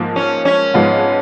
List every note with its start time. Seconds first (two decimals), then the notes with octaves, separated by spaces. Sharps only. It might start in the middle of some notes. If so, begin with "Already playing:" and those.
Already playing: G#2 F3 A#3
0.16 C#4
0.45 C#4
0.74 G#2 F3 G#3 B3 F4